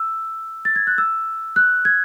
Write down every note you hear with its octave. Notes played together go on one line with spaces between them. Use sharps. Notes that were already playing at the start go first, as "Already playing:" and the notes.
Already playing: E6
A6
G#6
F#6
E6
F#6
G#6